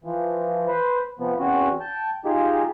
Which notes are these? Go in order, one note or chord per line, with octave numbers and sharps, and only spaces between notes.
E3 F3
B4 C5
C3 F3 B3
E2 C4 C#4 F#4
G5 A5
D#4 F4 G4 G#4